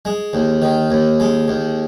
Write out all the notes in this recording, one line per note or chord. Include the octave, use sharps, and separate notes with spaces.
G#3
D#2
D#3
D#2
G#3
D#2